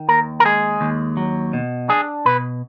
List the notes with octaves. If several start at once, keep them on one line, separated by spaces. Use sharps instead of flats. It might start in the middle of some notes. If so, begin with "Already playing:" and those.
Already playing: D#3
D#2 A#4
A#4
G#3 G#4
D#2
F#3
B2
D4 G#4
B2 B4